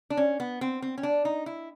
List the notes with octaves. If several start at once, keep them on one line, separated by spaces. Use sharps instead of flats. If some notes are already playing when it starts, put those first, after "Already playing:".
D4
C#4
B3
C4
C4
C#4
D4
D#4
E4